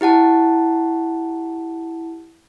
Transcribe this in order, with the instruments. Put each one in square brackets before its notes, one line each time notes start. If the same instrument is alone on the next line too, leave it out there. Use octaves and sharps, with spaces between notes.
[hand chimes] E4 G4 F#5 A5